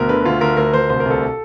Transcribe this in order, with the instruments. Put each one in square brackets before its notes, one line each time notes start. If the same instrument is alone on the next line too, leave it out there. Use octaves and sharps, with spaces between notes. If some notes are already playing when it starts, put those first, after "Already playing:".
Already playing: [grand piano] D2 B2 A#4
D3 B4
D2 F4
D2 A#4
D2 A#4
D2 C5
C2 C5
A#4
C2
A4